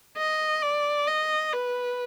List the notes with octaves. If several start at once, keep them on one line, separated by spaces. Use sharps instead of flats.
D#5
D5
D#5
B4